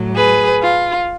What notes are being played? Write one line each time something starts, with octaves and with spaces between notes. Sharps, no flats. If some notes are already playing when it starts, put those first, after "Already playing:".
Already playing: A2 F#3
G#4 B4
F4